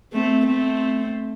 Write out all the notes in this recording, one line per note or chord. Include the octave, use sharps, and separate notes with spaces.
A3 C4
A3 C4